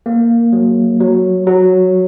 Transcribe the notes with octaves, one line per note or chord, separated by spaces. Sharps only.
A#3
F#3
F#3
F#3